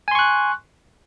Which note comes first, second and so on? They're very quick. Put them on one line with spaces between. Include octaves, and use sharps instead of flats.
G#5 C6 C#6 F#6